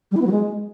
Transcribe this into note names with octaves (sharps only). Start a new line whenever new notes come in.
G3
E4
B3
F#3
G#3